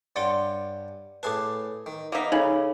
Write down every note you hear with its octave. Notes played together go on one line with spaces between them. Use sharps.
G2 C#5 D5 F#5 C6 D6
A2 G#4 B4 A5 D6
D#3
A#3 B3 D#4 D5 E5
C#3 D#4 A4 B5